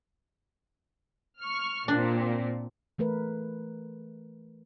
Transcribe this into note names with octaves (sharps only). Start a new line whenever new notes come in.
C#6 F6
A#2 C4 D4
E3 A3 A#4 B4